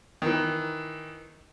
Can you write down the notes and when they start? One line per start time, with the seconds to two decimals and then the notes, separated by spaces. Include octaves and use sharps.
0.22 D#3 E3